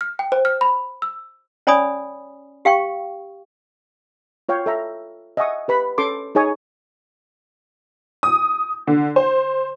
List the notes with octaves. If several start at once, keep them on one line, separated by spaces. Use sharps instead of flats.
F6
G5
C5
F6
B5
E6
C#4 C#5 D5 G#5 B5 D#6
G4 F5 G5 C#6
F4 C#5 F5 G5
A4 E5 A#5
D#5 E5 F#5 G#5 C#6 D#6
G4 B4 B5
C#4 A4 C6 D6
D#4 G#4 C#5 G#5 D#6
D#6
D3
C5